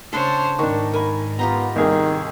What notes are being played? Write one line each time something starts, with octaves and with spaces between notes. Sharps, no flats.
C#3 D4 A4 C5 C#5
G#2 D#3 D4 C#6
A#4 G#5 B5
B3 F4 G4 D#5 A#5
C2 D#3 G#4 A#4